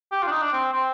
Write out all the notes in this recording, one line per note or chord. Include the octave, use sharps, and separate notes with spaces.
G4
F4
D4
D#4
D4
C4
C4